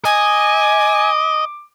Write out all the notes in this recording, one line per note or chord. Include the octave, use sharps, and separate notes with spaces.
D#5 G#5 D6